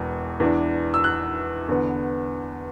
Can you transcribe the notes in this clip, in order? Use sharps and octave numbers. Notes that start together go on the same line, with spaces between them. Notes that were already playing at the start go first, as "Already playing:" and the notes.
Already playing: E1 E2 E3
E2 E3 D4
E6
F#6
E2 D3 B3